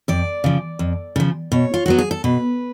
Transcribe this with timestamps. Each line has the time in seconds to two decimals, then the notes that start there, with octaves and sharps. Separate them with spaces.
0.08 F2 D5
0.44 C#3 F3
0.79 F2
1.16 C#3 F3
1.52 B2 C#5
1.74 F4
1.86 F#3 B3 F#4
1.98 G#4
2.11 A4
2.24 B2 B4